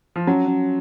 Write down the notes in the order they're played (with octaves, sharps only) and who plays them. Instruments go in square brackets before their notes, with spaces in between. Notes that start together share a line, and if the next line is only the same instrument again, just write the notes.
[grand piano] F3
[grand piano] F#3 [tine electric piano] C#4
[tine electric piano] C#4